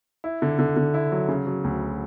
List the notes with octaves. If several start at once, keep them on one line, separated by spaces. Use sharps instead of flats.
E4
D3
D3
D3
E4
F#3
C#3
F#3
D2